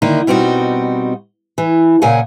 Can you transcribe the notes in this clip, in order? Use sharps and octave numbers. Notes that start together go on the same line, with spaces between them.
D3 D#3 A#3 D#4 E4
B2 G3 C4 D#4 F#4
E3
A#2 C#3 A#4 F#5 G#5